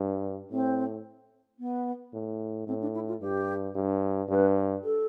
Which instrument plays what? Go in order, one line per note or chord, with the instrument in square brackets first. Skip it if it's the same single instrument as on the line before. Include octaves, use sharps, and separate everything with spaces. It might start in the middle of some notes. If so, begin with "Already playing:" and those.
Already playing: [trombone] G2
[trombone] A2 [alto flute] C4
[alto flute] B3
[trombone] A2
[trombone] A2 [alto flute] C4
[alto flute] D4
E4
F4
[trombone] G2 [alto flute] G4
[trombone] G2
[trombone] G2 [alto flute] B4
[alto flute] A4